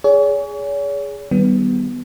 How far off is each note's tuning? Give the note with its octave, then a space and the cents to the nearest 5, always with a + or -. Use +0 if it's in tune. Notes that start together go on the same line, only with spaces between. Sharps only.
G#4 +0 C#5 +40
D#3 +0 G3 -20 B3 +0